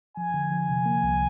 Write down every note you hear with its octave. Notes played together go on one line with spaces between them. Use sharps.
F3 G#5
D3
F3
C3
A#3
C2